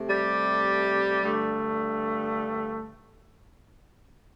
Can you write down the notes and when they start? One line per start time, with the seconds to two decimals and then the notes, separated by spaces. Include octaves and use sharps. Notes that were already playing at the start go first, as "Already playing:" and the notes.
Already playing: C3 A3
0.09 G3 G4
1.23 G2 D3 A3